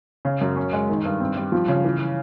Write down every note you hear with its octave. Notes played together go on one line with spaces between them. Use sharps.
C#3
F#2
C#4
G#3
D#3
G2
C4
G3
F3
C#3
E3